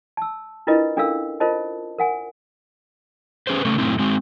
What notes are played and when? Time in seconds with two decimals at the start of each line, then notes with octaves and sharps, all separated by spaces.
0.17 A5 E6
0.67 D4 E4 F4 A#4 B4 D#5
0.97 C#4 D4 A4 A#4 F5 E6
1.40 F4 A#4 C5 D#5 A5
1.99 A#4 F#5 G#5
3.47 C#4 G#4 B4 C5
3.65 C#3 A3 A#3 C#4 A4
3.78 F#2 A2 A3 C4 E4
3.99 G#3 C4 F#4